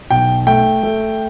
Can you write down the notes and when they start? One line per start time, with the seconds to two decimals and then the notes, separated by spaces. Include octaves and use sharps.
0.10 B1 G5
0.47 A3 G5
0.83 A3